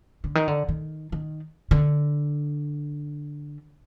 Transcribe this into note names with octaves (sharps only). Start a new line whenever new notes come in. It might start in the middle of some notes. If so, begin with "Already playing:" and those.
D3
D#3
D3
D#3
D#3
D3